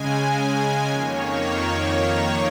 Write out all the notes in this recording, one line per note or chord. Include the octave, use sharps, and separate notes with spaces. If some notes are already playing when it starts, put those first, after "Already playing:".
Already playing: C#3 G#3 G#5
G#5
G#5
F2 D#3 A#3 C#5
C#5